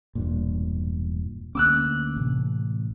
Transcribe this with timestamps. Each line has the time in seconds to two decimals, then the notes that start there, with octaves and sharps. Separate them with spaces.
0.15 E1 G2 A#2
1.55 D2 A#3 C#4 D6 E6 F#6
2.16 A1 C3